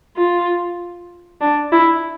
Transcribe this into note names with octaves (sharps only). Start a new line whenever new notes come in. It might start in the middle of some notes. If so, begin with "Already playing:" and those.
F4
D4
E4